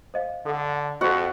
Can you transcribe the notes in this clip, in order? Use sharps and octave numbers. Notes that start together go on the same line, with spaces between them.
C5 D#5 F5
D3 A4 F#5
F2 F#4 A4 C5 F#5